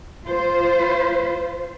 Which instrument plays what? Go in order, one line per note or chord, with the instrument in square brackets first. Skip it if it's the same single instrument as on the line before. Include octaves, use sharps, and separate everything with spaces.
[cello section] F4 C5